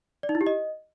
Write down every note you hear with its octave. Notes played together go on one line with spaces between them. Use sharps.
D5
D#4
E4
G4
D#5